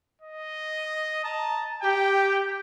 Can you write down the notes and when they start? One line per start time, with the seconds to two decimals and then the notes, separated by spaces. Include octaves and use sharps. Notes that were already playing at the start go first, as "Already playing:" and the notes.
0.21 D#5
1.24 A5 A#5
1.83 G4 G5